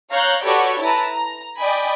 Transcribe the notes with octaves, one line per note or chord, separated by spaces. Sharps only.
C#5 F5 A#5 F#6 G6
F#4 G4 A4 B4 C#5 D5
E4 B4 A5 A#5
A#5
D5 D#5 G5 G#5 B5